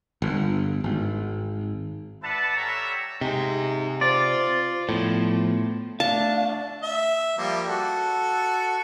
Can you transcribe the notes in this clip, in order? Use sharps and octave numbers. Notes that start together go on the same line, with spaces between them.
G1
G#1
B4 D5 E5 F#5 A5
G3 A4 C#5 E5 F#5 A#5
C3 D#4 G#4
F4 C5 D5
A2 F3 B3
A3 D4 F5 A5
E5
F3 G3 A#3
F#4 A4